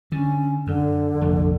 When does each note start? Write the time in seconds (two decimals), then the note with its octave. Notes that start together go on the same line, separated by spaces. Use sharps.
0.12 D3 C#4
0.67 F#2 D3
1.22 F1 A#1 F2